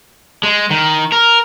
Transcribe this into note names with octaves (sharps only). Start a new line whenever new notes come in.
G#3
D#3
A#4